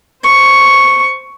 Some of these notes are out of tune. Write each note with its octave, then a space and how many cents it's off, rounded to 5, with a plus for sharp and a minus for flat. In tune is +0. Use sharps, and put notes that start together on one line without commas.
C5 +0 C#6 +0